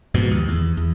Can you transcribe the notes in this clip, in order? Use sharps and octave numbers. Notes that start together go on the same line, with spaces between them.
F2 G#2 B2
D#2
E2
E2